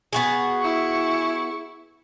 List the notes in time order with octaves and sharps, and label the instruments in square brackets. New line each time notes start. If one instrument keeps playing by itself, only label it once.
[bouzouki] B3 F#4 G#4
[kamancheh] E4 C#6